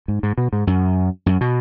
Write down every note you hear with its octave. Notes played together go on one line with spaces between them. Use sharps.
G#2
G#2
B2
G#2
F#2
F#2
B2